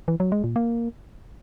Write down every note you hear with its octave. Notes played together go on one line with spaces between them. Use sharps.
E3
F#3
G#3
A#2
A#3